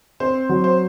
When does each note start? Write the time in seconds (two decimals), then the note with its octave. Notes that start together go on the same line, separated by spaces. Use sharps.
0.20 C4 C5
0.49 F#3
0.64 C5